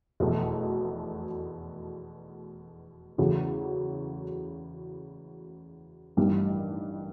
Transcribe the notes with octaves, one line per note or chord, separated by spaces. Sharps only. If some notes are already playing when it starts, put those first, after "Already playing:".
F1 E2 B2 F#3 A3
E2 C#3 F#3 A3
A1 G2 D#3 G3